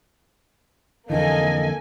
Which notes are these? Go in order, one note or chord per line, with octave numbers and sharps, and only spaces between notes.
F2 D3 E3 A#3 A4 D#5 G#5